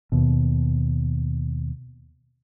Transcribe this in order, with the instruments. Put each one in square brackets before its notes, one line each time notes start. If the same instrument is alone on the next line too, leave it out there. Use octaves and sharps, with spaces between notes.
[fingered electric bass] D#2 B2